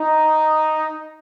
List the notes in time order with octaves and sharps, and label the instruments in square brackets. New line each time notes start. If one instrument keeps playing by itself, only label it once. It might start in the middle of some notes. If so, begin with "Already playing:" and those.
Already playing: [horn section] D#4